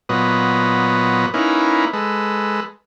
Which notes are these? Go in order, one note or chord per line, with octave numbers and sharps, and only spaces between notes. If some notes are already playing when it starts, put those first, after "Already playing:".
A#2 F#3 B3 B4 D#5
A#3 C#4 D#4 E4 B4
G#3 A4 B4